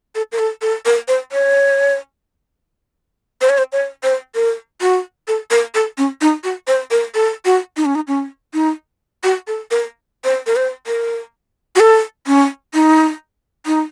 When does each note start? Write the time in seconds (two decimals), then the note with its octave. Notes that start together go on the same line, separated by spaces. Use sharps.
0.15 A4
0.32 A#4
0.39 A4
0.62 A4
0.85 A#4
1.08 C5
1.32 C#5
3.41 C5
3.49 C#5
3.58 C5
3.72 C#5
4.03 C5
4.35 A#4
4.81 F#4
5.28 A4
5.51 A#4
5.75 A4
5.98 C#4
6.21 D#4
6.44 F#4
6.67 C5
6.91 A#4
7.15 A4
7.45 F#4
7.77 D#4
7.85 C#4
7.95 D#4
8.08 C#4
8.54 D#4
9.24 F#4
9.47 A4
9.71 A#4
10.24 C5
10.47 A#4
10.56 C5
10.87 A#4
11.76 F#4
11.80 A4
12.27 C#4
12.74 D#4
13.66 D#4